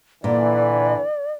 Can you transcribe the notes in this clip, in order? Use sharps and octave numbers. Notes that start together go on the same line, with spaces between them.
A#2 D3 E3 D5